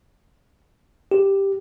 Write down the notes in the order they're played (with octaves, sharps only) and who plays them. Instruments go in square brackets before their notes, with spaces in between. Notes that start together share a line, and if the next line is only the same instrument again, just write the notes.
[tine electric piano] G4